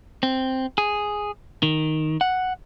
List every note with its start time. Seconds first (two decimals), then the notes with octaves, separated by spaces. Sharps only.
0.23 C4
0.78 G#4
1.63 D#3
2.21 F#5